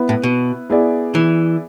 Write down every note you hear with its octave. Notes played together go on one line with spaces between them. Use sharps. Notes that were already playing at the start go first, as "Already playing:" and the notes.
Already playing: B3 E4 B4
A2
B2
B3 E4 G#4 D5
E3